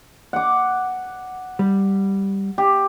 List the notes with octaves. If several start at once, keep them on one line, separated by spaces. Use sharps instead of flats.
F#5 D6
G3
G4